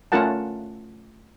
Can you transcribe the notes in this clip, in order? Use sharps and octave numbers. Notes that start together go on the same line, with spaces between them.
A3 C#4 F4 A#4 F#5 A5